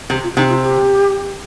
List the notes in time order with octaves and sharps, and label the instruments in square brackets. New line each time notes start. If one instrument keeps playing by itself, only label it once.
[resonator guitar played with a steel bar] C3 [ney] G4
[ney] F4
[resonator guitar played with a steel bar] C3 [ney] D#4
[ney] F4
G4